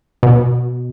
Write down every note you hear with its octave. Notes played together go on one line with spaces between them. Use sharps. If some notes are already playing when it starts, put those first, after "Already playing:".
B2